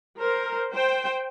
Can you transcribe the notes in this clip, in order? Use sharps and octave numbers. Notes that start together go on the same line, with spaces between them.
A#4 C5
C5 G5